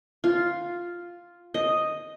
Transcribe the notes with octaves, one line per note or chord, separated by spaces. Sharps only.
F4
D#5